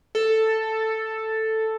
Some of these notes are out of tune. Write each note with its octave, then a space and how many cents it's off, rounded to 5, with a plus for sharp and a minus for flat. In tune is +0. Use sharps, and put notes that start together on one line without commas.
A4 +5